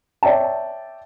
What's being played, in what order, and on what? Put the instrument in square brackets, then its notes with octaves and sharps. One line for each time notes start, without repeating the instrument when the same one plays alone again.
[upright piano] C#5 D5 E5 G5 A5